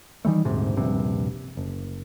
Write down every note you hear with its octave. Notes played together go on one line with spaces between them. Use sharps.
D#3 E3 G3 A3
D#1 D2 G#2 C3
D#1 A#1 G2 C3
F#1